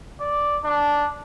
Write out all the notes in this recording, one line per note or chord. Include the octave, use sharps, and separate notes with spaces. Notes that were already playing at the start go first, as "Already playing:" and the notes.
D5
D4